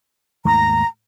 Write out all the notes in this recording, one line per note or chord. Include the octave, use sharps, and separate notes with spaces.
D#2 G#2 A3 A#5